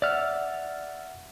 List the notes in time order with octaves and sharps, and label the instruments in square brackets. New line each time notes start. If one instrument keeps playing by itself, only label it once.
[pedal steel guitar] D5 F6 [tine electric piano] E5 F#5 E6